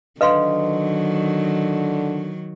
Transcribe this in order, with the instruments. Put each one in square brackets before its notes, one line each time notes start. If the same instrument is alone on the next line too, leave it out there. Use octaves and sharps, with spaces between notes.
[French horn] D3 [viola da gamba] D#3 F#3 [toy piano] B4 F5 C6 [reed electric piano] D#5